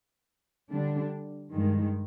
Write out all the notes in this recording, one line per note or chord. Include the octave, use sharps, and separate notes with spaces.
D3 G3 D4
G2 D#3 G#3